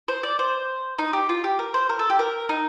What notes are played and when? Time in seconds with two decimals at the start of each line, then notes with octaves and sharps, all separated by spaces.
0.08 C5
0.23 D5
0.39 C5
0.99 D#4
1.13 G4
1.29 F4
1.44 G4
1.59 A#4
1.74 C5
1.89 A#4
1.99 A4
2.10 G4
2.19 A#4
2.49 D#4